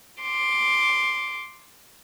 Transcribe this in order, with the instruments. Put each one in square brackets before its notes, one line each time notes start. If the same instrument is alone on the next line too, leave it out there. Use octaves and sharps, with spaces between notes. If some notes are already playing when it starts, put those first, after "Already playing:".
[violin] C6 D6